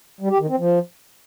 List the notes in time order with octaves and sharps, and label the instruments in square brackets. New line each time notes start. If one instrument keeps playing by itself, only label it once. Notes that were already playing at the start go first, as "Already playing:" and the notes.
[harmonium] G3
G4
D#3
C4
F3